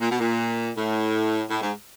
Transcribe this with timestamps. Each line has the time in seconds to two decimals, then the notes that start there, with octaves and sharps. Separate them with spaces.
0.01 A#2
0.11 B2
0.20 A#2
0.75 A2
1.50 A2
1.61 G#2